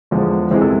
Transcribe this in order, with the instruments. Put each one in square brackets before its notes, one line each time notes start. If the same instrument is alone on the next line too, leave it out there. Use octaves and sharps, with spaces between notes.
[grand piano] E2 D3 F3 G#3
E2 C3 E3 G#3 C5
A4